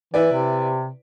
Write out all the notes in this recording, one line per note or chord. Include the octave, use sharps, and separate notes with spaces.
E3 E4 B4 D5
C3